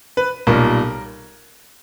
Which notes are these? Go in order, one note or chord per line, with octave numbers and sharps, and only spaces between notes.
B4
B1 A#2 G3 A#4